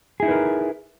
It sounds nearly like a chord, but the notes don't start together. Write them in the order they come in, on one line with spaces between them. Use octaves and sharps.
G#4 E4 D#4 B4 A#4